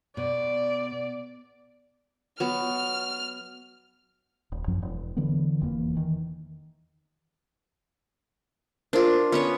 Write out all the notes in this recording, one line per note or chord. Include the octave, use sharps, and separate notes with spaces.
B2 D5
F#3 B3 F6
D#1
A1 F#2 F3 F#3
E1
D3 E3 F#3 B3
F1 E2 E3 A#3
D#3 E3
D4 F4 A#4 C5
B3 C#4 C#5